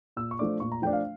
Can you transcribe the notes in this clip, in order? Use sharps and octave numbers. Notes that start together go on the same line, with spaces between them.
A#2 E6
C#6
F3 A3 D4 D6
A#2 C#6
A#5
F3 A3 D4 G5
F5